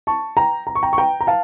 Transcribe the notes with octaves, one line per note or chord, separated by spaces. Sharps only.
A5 C#6
G5 A#5
A#5
C#6
G5 A#5
C#6
G5 A#5
A#5
F5 A5